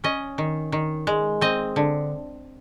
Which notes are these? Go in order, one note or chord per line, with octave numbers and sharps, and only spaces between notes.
C#4 D#5
D#3
D#3
G#3
C4 D#5
D3